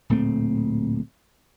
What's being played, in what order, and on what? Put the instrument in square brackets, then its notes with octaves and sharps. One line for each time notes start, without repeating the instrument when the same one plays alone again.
[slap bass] D1 A#2 A3 C4